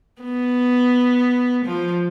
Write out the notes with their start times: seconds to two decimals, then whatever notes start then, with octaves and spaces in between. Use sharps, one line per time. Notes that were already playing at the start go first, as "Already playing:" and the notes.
0.21 B3
1.65 F3